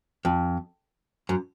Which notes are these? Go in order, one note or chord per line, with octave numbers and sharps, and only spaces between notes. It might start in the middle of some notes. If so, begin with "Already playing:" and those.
F2
F#2